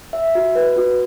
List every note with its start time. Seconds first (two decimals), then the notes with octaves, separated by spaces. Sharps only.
0.13 E5
0.35 F#4
0.55 B4
0.76 F#4